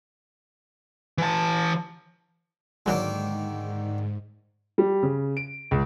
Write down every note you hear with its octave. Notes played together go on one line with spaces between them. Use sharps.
E3 A5
G#2 D3 D#3 F#3 G#3 A#3
G3
C#3
D7
C#2